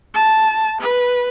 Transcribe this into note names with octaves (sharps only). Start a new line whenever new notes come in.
A5
B4